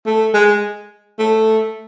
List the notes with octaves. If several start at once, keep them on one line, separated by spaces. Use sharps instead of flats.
A3
G#3
A3